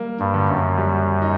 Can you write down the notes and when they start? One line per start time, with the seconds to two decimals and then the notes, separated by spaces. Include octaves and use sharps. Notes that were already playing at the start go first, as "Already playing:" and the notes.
Already playing: G3 A#3
0.20 G2
0.34 D3
0.48 F#2
0.78 G3
1.22 D#4